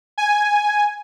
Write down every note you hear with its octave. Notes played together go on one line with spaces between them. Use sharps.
G#5